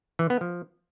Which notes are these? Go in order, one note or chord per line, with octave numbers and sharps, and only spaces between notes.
E3
B3
F3